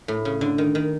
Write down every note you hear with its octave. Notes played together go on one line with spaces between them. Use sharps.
A2
C#3
D3
D#3
D#3